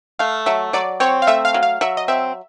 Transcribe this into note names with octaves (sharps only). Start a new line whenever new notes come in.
A3 F5
F#3 E5
F#3 D5
C4 C#5
F5
A3 E5
F5
F#3
F5
F#3 E5
D#5
C4 E5